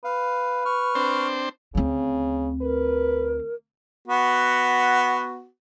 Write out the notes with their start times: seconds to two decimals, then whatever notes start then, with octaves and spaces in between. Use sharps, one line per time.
0.04 B4 F5
0.65 C#6 F6
0.95 C4 D4 C5
1.75 D2 C#3 C4
2.61 A#4 B4
4.08 B3 F#4